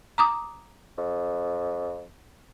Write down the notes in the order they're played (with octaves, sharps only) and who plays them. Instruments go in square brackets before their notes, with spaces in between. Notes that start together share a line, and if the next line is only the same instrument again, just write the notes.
[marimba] A#5 D6 D#6
[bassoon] F2